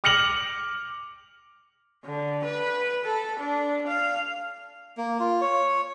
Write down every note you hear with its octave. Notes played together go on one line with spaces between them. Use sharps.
D6 F6 A#6 C#7 F7 F#7
D3
B4
A4
D4
F5
A#3
F4
C#5